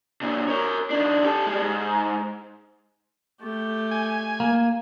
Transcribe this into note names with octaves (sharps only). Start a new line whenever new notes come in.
A#2 D3
A#4 C#5
D#3 D4
G4 A4
G3 G#3
G#2
A3 G4
G#5
A#3